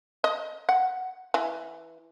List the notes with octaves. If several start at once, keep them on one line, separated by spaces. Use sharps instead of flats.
D#5
F#5
E3